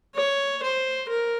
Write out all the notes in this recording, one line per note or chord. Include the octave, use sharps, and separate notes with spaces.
C#5
C5
A#4